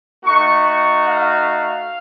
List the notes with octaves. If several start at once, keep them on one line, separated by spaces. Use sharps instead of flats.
A3 D#4 F#4 C#6
C#6
F5